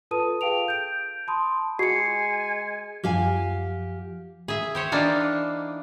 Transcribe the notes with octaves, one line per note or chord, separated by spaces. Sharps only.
F4 A4 B4 A5 D#6 D#7
G#4 F5 G5 D7 F7
G6 D7
A5 B5 C6 D#6
G#3 F#4 G#5 C7 C#7
F#2 F3 G4 F5 G#5
G#4 E5
G4 C5 C#5
E3 A#3 D4 D#4 G4